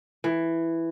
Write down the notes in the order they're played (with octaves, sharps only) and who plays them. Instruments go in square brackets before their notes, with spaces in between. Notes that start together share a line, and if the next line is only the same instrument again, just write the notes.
[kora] E3